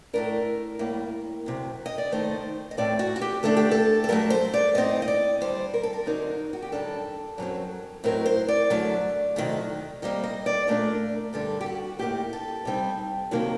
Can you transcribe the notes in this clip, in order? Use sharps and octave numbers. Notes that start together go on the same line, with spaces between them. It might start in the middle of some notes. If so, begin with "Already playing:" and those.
A2 A3 D4 A#4
A2 G3 A#3
D2 C3 F#3
D#5
D5
D#2 D#3 A3 D#4 C5
D#5
A2 A3 C4 D5
F#4
F#4
G4
D3 A3 D4 A4
G4
A4
A4
G2 D3 F#3 A3 A#4
C5
D5
A2 G3 C4 D#4 D#5
D#5
D5
D#2 D3 G3 C5
A#4
A4
A#4
D2 D3 F#3 C4 D#4 A#4
F#4
G4
F#2 D#3 G3 D4 A4
F#2 F#3 C4
A2 F#3 C4 D#4 A#4
C5
D5
F#2 D3 F#3 A3
C3 D#3 F#3 A3
C3 G3 A#3 D#5
D#5
D5
A#2 A3 D4 A#4
G2 D3 G3 A4
G4
F#4
A2 G3 A#3 D#4 G4
A4
C3 G3 C4 D#4
D2 C3 D#3 F#3 A#3